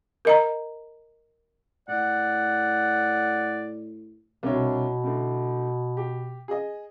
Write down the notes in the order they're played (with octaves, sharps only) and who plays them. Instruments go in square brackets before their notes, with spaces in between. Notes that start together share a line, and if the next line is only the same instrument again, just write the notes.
[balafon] A#4 D#5 A#5
[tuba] A2 [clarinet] D5 [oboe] F#5
[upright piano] C2 D4 C#5 [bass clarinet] B2
[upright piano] A2 D3
G4
G#4 D#5